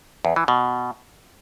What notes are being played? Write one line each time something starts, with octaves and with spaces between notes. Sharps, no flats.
E2
E3
B2